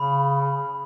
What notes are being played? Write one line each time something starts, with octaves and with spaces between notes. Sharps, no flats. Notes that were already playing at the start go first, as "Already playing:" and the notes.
Already playing: C#3 B5